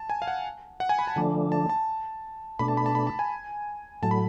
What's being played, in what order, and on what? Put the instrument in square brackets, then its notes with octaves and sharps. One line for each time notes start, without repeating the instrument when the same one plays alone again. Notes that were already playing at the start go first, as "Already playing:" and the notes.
Already playing: [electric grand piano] A5
G#5
F5
F#5
F#5
G#5
B5
A5
[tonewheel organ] D3 F3 A3 D4
[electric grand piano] A5
A5
[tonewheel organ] B2 A3 D4 [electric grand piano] B5
[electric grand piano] A5
B5
A5
B5
A5
G#5
[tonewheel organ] A2 F#3 A3 [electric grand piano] A5
[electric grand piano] B5